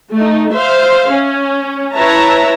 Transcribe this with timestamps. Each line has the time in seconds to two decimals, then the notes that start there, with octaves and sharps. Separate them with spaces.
0.14 A3 D#4
0.54 C5 E5 F5
1.09 C#4
1.93 E4 B4 C#5 E5 A5 A#5